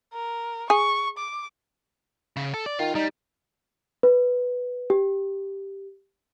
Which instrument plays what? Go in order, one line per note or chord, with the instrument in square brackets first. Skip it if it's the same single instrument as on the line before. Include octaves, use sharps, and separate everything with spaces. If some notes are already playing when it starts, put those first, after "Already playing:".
[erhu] A#4
[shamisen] G#4 [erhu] C#6
[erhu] D6
[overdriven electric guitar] C#3
A4
D5
[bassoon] D#3 [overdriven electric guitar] F4
[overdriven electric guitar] G3 [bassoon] D#4
[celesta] B4
G4